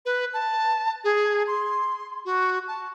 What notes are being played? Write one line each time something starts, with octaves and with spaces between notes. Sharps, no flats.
B4
A5
G#4
C6
F#4
A5